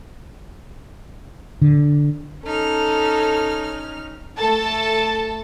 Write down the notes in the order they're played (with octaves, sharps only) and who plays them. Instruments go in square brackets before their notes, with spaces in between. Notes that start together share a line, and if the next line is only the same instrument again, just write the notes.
[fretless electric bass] D3
[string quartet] C#4 D#4 F6 [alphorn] A4
[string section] A3 A4 A5